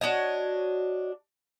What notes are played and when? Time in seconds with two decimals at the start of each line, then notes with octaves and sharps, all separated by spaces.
0.01 D4 F#4 C#5 D#5